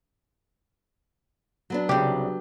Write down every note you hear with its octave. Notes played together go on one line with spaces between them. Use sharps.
F#3 B3 D4
C2 C#3 G4